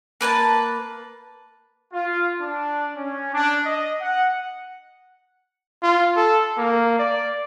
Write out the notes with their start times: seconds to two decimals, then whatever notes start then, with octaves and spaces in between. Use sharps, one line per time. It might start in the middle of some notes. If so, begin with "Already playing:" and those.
0.21 A#3 B4 G#5 A5
1.93 F4
2.40 D4
2.96 C#4
3.33 D4
3.64 D#5
4.01 F#5
5.82 F4
6.16 A4
6.58 A#3
6.99 D5